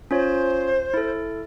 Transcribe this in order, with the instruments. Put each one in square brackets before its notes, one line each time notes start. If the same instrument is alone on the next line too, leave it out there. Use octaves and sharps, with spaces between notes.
[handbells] C#4 F4 C#5 [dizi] C5
[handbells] E4 A4